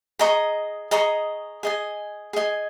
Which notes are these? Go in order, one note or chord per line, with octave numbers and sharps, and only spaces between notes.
G#4 D#5 A#5 C#6
G#4 D#5 A#5 C#6
G#4 D#5 G#5
G#4 D#5 G#5